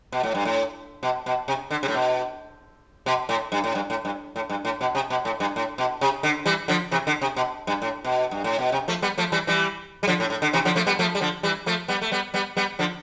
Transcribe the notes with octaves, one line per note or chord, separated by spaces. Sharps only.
B2
A2
G2
A2
B2
B2
C3
D3
C3
A2
B2
B2
A2
G2
A2
G2
A2
G2
A2
G2
A2
B2
C3
B2
A2
G2
A2
B2
C3
D3
E3 G3
D3 F3
C3 E3
D3
C3
B2
G2
A2
B2
G2
A2
B2
C3
F3 A3
G3 B3
F3 A3
E3 G3
E3 G3
G3
D3 F3
A2
A2
D3
C3 E3
D3 F3
F3 A3
G3 B3
F3 A3
G3
D3 F3
E3 G3
F3 A3
G3 B3
A3
G3 B3
G3 B3
G3 B3
D3 F3